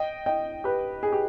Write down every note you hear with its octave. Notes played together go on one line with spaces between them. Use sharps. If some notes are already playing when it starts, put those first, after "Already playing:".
Already playing: D#5 G5
D#5 G5
G4 B4
G#4
G4